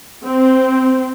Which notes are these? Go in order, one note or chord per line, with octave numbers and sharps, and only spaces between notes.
C4